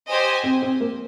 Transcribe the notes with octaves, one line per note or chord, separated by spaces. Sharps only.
G4 C5 D#5 G#5
C4
C4
A#3